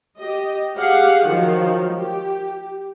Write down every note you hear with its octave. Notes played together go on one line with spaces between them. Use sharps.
G4 D#5
G4 G#4 F5 F#5
D#3 F3 F#3
G4